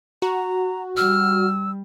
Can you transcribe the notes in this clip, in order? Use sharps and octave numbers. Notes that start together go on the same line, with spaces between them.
F#4 A#5
G3 E6 F6